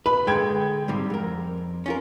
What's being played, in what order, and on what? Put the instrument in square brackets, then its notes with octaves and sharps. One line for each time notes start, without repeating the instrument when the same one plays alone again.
[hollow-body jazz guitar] B4 [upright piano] B5
[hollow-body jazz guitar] D3 G#3 [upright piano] G5 G#6
[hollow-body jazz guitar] G#2 C3 G3
F2 A#4
C#4 F4 A#4